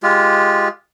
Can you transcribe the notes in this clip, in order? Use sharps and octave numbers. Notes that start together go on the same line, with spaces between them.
G#3 F4 G4